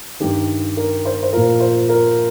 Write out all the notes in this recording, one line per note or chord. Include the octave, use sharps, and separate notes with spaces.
G2 D#3 G4
A#4
C5
C5
A#2 F3 A#4
C5
A#4